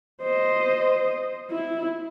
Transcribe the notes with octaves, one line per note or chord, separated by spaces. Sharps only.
C5 D#5
E4